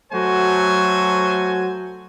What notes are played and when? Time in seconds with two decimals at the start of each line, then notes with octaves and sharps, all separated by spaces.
0.12 F#3 A3 F#4 A4 C5 G#5